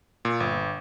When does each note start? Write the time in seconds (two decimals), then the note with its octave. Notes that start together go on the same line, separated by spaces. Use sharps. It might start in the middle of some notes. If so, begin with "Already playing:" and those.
0.25 A#2
0.40 G1